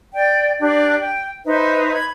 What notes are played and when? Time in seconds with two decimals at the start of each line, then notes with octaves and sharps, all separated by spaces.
0.14 D5 G5
0.60 D4 G4 D5
0.99 G5
1.45 D#4 B4 C5 E5
1.94 B5 G#6